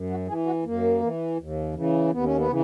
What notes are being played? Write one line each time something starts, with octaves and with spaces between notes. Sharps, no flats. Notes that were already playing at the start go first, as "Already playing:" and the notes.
Already playing: F#2
F#4
E3 G#4
F#4
F#2 A#3
E3
D#2
C#3 E3
D#2 B3
C#4
B3
C#3 E3